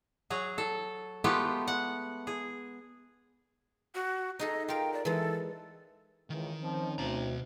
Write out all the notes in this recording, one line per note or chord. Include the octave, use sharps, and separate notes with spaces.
F#3 G#4 A#5
A4
G#3 A3 B3 F4 G4
F#5
G#4
F#4
D#4 G#4 A4 D#5
F4 A#4 G5
D5
E3 G#3 A4
C#2 D#3 E3
F3 C4 C#4 D#4
D2 B2 A#5